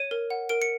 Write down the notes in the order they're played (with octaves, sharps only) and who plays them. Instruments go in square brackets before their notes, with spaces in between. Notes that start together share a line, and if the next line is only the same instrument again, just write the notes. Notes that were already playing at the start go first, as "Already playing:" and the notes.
Already playing: [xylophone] C#5 D#7
A#4
F#5
A#4 D7
C#7